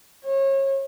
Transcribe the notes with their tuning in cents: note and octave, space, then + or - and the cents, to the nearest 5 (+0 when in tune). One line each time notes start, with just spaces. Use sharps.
C#5 -30